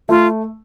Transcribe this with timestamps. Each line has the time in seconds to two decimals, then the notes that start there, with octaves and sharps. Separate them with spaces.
0.09 A3 F4